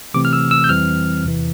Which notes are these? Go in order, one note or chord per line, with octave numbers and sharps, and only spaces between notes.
C3 E3 A3 C4 D6
F6
E6
E6
G6
F2 E3 G3 C4 F6
E2 C3 E3